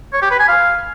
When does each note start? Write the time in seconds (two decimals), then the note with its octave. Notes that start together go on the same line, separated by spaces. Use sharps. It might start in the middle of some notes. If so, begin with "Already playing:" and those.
0.13 C#5
0.22 G4
0.31 B4
0.40 G#5
0.48 F5